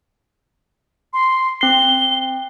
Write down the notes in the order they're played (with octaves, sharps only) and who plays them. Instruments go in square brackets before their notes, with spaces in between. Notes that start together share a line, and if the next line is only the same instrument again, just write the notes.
[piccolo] C6
[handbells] C4 C7 [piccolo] G7